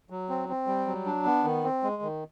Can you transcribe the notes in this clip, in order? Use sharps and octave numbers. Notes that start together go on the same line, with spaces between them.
F#3
C4
C4
G3
F#3
D4
B3
D#3
C4
G#3
D#3